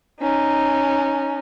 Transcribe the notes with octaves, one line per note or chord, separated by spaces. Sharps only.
C#4 D#4